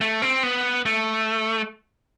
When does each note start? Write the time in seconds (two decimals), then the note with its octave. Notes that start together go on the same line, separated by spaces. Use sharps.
0.01 A3
0.22 C4
0.43 B3
0.85 A3